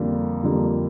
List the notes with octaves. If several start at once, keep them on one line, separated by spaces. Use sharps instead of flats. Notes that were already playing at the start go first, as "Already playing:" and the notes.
Already playing: F2 D3 G3 A#3
F2 D3 G3 A#3